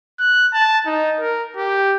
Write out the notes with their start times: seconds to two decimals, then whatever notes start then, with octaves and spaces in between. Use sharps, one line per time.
0.19 F#6
0.53 A5
0.86 D#4
1.20 A#4
1.57 G4